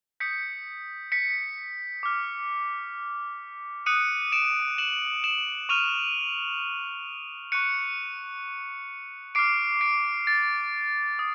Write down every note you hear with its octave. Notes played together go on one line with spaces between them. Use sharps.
D#6 G6 B6 C#7
B6 C#7
D6 F6
D#6 F#6 C#7 D#7
D7 E7
E7 F#7
E7 F#7
C#6 F6 D#7 F7
C#6 F#6 C#7 D#7
D6 F6 C7 D7
C7 D7
A6
D#6